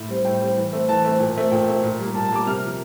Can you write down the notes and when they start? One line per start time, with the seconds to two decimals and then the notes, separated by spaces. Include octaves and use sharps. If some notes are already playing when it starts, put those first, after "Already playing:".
Already playing: A2
0.09 G3 C4
0.25 A2 G5
0.41 G3 C4
0.57 E3
0.73 A3 C4
0.89 E3 A5
1.05 A3 C4
1.20 A#2
1.36 A3 C4
1.52 A#2 G5
1.68 A3 C4
1.83 A#2
1.99 G3 A#3
2.14 A#2 A5
2.26 A5
2.31 G3 A#3 D6
2.46 C3 F6
2.63 F3 A#3